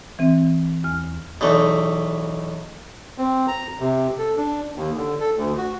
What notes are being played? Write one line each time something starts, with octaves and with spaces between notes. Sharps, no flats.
E3 C4
E2 F6
B1 E2 A3
C4
A#5
C3
A4
D4
D#2
D3
A4
D2
F#4